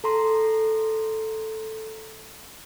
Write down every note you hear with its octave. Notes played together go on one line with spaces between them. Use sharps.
A4 A#5 C6